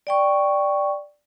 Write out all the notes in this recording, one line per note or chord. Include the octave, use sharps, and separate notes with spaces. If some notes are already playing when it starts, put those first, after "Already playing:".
D5 G5 C#6